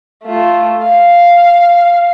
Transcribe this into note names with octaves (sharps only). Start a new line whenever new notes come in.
A3 F4
F5